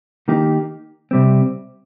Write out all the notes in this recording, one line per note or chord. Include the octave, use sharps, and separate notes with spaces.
D#3 A#3 D#4 G4
C3 G3 C4